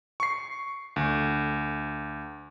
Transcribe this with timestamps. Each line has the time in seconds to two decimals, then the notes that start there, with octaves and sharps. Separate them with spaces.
0.20 C#6 C7
0.96 D2